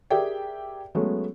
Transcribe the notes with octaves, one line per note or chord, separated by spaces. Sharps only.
G4 G#4 A#4 D5 E5 G5
F#3 G#3 A3 B3 C#4